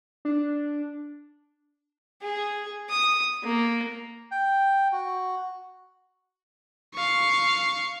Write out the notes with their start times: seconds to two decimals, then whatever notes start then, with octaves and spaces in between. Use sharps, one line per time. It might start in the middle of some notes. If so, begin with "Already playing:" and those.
0.25 D4
2.22 G#4
2.90 D#6
3.43 A#3
4.31 G5
4.92 F#4
6.95 F5 C#6